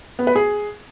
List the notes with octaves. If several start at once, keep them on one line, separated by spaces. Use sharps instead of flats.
B3
B4
G#4